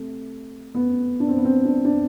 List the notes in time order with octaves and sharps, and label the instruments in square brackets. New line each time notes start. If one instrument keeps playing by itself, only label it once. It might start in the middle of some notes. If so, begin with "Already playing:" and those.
Already playing: [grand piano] C3 A3
B3
D4
C4
B3
C4
D4
D4